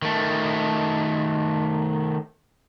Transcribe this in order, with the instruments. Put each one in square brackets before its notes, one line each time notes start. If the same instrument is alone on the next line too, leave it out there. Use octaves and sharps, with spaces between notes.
[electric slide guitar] D#3 A3